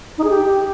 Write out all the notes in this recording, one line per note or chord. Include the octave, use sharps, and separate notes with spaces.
D#4
G#4
G4